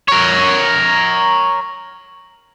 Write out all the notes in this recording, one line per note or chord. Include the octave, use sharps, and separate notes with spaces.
A#4 C#5